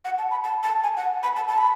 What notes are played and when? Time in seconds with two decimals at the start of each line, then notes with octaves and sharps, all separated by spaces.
0.05 F#5
0.18 A5
0.31 B5
0.44 A5
0.63 A5
0.83 G#5
0.97 F#5
1.23 B5
1.36 A5
1.48 A5
1.58 B5